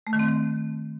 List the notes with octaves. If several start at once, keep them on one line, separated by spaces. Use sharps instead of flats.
A3
D#3
C4